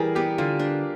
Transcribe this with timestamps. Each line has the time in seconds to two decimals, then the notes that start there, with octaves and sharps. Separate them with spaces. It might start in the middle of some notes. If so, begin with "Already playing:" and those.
Already playing: E3 G3 G#4 A#4
0.15 B3 G4
0.38 D3 F4
0.59 D4